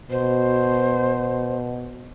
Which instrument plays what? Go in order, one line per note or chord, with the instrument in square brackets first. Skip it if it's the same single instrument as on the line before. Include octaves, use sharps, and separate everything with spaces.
[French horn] B2 [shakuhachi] C5